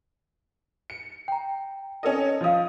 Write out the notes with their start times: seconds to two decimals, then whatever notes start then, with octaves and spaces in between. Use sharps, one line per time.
0.90 C#7
1.28 G5 A#5
2.03 C#4 A4 D#5
2.41 F3 D#5 F5 D#6